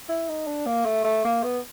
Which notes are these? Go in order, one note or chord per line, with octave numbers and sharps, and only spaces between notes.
E4
D#4
D4
A#3
A3
A3
A#3
B3